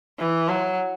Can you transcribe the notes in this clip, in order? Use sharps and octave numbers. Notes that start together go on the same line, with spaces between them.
E3
F#3